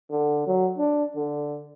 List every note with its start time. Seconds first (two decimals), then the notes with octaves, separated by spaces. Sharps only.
0.10 D3
0.47 F#3
0.78 D4
1.16 D3